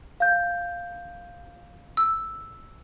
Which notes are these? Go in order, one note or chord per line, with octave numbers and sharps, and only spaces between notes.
F5 G6
E6